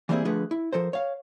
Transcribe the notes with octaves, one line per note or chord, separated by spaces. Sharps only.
E3 G3 A#3 C4 E4 G#4
D3 F3 A3 G#4 B4
E4
F3 A4 A#4 C5
C#5 F5